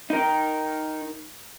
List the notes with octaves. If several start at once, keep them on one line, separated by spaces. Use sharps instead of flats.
D#4 A#4